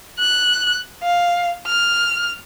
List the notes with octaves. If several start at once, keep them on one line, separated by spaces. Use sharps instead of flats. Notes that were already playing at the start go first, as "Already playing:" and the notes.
F#6
F5
F6